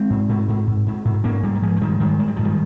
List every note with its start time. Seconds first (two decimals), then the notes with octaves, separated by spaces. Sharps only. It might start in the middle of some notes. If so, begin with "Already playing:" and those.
Already playing: G#3 C4
0.10 G#2
0.29 G#2
0.48 G#2
0.67 G#2
0.87 G#2
1.05 G#2
1.24 G#2 A#3 C#4
1.43 G#2 G3 A#3
1.55 A#3
1.62 G#2 F3 G#3
1.76 F3
1.81 G#2 D#3 G3
2.00 G#2 D#3 G3
2.19 G#2 G#3
2.28 G3
2.36 G#2 F3
2.45 D#3 G3